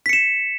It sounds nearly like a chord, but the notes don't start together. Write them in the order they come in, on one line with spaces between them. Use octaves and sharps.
B6 C#7 E7